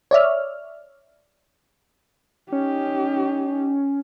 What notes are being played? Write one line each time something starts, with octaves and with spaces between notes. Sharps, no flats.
C#5 D5 E5 F6
C#4 D#4 G4